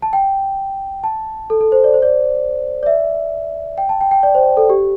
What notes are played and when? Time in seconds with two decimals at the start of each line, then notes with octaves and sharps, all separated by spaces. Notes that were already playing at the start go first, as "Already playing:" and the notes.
0.02 A5
0.13 G5
1.04 A5
1.50 A4
1.61 A4
1.72 C5
1.84 D5
1.94 C5
2.02 D5
2.83 D5
2.86 E5
3.78 G5
3.89 A5
4.01 G5
4.11 G5
4.23 D5
4.35 C5
4.57 A4
4.70 G4